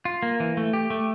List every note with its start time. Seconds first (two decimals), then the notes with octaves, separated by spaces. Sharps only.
0.05 F4
0.23 A#3
0.40 E3
0.57 A3
0.73 G4
0.90 A3